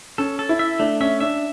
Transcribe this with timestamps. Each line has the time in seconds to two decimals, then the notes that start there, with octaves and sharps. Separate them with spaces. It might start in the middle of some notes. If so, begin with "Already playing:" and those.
0.18 C#4 A4
0.39 A4
0.49 E4
0.59 E5
0.80 A3 D4
1.00 C#4 E5
1.20 D4 E5